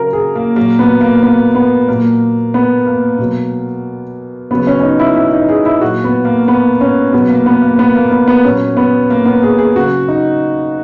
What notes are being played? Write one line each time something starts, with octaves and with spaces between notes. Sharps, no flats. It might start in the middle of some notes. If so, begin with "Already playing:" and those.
Already playing: C#3 F#3 A#4
G#4
A#3
A#2 F#3 A#3
B3
A#3
B3
B3
A#2 F#3 A#3
B3
A#3
B2 F#3
C#3 F#3 B3
C#4
C#4
D#4
E4
E4
D#4
G#4
E4
A#2 F#3 F#4
B3
A#3
B3
C#4
B2 F#3 B3
A#3
B3
A#3
B3
A#3
B3
B3
A#2 F#3 C#4
B3
A#3
B3
G#4
G#4
C#3 F#3 F#4
D#4